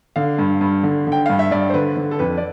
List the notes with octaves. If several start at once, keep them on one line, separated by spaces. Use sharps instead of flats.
D3 F5
G2
G2
D3
D3 G5
G2 F5
E5
G2 D5
C5
D3 B4
D3
A4
F2 B4
D5